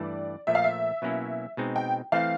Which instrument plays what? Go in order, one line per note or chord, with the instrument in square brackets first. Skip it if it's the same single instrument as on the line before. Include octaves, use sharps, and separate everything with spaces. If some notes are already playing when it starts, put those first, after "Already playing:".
Already playing: [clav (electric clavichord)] G2 E3 A3 [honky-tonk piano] D5
[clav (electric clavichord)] A#2 F3 A3 [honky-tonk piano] E5
[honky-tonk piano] F5
E5
[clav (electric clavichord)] B2 F#3 A#3 C#4 E4
B2 G#3 C4 D#4
[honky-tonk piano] G5
[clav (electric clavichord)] E3 A3 C4 [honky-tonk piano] F5